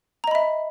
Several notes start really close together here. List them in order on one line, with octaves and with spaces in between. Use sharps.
A#5 D#5 B5 E5